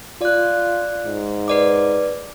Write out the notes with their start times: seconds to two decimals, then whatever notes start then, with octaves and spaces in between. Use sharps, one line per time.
0.22 F4 D5 F#6
1.06 G#2
1.48 B4 D5 D6